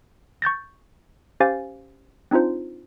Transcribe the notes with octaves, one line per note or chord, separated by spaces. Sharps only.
C#6 G6 A6 A#6
C#4 G4 C5 F5 G#5 A6
C4 D4 D#4 F4 C5